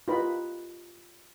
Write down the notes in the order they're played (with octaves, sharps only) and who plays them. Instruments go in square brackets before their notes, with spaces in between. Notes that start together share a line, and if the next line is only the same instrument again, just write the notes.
[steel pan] F4 G4 A#4 B4 D#5 B5